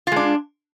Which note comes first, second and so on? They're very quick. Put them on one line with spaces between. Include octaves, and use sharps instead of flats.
F4 G#3 D4